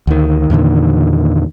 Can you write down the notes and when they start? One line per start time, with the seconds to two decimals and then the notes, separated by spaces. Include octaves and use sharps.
0.07 D2 D#3
0.50 E2 A#2 D3 D#3